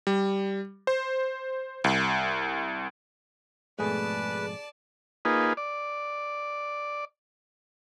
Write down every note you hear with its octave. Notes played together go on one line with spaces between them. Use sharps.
G3
C5
C2
F2 G#2 B2 A3 G#4 B4 D5 A5
A#3 D#4 F4 G#4 B4
D5